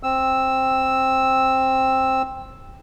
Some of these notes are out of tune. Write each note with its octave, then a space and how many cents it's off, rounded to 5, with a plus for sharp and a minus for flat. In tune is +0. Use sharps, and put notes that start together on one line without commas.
C4 +10 E6 +0